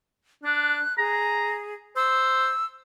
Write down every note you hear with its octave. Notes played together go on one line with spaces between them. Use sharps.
D4 F#6
G#4 A#5
C5 E6